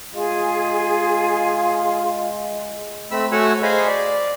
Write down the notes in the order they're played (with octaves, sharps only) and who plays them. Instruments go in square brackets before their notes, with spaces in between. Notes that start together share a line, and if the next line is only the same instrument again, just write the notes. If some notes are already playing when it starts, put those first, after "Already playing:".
[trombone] G#3 [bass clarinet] F4 [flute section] G#4
[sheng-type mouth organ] A3 C4 B5 E6
A3 F#4 C#5 F#5 G#5 E6
G#4 C5 D#5 F5 G#5 B5
D5